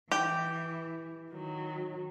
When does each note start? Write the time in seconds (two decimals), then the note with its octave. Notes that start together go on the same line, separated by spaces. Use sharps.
0.12 E3 G4
1.31 D#3 F#3